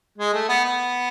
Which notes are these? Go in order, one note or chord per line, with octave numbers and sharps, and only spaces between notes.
G#3
A3
B3
B3